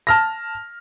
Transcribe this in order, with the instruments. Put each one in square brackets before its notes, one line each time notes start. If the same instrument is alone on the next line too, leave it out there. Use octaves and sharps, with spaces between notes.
[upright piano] A5 F6 A#6